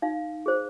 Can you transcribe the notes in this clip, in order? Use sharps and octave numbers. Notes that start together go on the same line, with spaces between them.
D#4 F5
G#4 C5